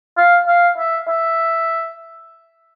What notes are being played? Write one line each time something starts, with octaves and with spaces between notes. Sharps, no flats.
F5
F5
E5
E5